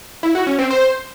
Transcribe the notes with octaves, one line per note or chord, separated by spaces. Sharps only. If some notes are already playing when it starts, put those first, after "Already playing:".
E4
F#4
C#4
C4
C5